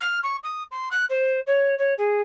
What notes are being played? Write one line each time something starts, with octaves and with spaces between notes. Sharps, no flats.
F6
C#6
D#6
C6
F#6
C5
C#5
C#5
G#4